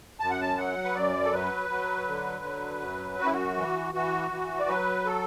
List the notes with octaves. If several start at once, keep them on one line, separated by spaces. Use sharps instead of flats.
F#2 A5
F#5
A5
F#3 F#5
B4
F#2 D5
A4
F#3 B4
F#3
D3
F#3
F#2
F#2 F#4
E4
F#4
E3
E3 F#4
E3
D5
F#3 B4
A4